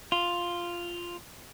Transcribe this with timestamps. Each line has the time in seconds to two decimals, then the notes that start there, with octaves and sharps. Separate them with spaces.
0.12 F4